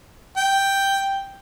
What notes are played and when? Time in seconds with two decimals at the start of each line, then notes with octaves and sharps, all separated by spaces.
0.37 G5